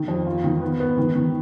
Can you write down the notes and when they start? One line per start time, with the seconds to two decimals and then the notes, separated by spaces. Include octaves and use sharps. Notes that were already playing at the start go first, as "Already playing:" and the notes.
Already playing: D#3
0.08 F2
0.27 F4
0.44 D#3
0.61 B3
0.80 B3
0.98 D#3
1.15 D#3